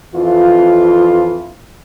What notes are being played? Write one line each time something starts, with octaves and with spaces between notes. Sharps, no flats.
F2 E3 F4